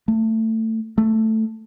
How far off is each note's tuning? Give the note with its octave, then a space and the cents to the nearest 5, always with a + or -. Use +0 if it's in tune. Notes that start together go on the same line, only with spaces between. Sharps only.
A3 +20
A3 +5